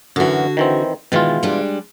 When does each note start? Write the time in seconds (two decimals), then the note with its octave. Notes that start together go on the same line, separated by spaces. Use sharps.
0.16 F#2 D3 E3 F#4
0.57 D#3 E3 C4
1.12 B2 D#3 E3 G#3 F4
1.43 G3 G#3 D4